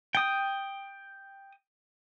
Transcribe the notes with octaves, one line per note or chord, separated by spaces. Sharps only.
G5 D#6